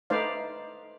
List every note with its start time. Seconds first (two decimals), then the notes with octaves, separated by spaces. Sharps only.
0.10 A3 D#4 B4 C5 D5 F5